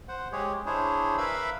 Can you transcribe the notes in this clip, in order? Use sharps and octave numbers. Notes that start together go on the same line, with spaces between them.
C5 F#5
G#3 G4 G#4 C#5
D4 E4 G#4 C5 C#5
A#4 B4 E5 F5 B5 E6